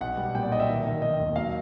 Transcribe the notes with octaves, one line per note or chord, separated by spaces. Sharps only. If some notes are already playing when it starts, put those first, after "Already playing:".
B1 F#5
G3
A#2 G5
D5
B1 D#5
E5
D#3
D#3
D#3 D#5
D#2
F#3 F5